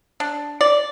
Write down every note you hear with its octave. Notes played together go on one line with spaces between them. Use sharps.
D4
D5